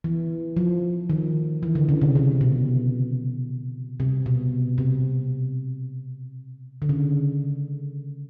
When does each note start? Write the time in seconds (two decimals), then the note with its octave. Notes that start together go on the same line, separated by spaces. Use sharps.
0.04 E3
0.57 F3
1.10 D#3
1.63 E3
1.75 D3
1.89 C#3
2.01 C3
2.15 C3
2.41 B2
4.00 C3
4.26 B2
4.78 C3
6.82 D3
6.89 C#3